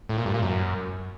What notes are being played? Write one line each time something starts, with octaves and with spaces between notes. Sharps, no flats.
A2
A#2
G2
A#2
F#2